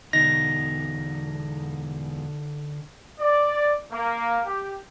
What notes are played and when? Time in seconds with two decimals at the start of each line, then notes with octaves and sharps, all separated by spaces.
0.13 E2 B2 D3 D#4 A#6
3.19 D5
3.92 A#3
4.45 G4